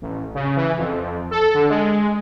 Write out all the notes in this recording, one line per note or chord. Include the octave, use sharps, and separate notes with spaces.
A1
C#3
E3
F2
A4
D3
G#3